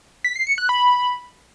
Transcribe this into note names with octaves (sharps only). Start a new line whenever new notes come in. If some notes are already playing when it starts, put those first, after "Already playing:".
B6
C7
C#7
F#6
B5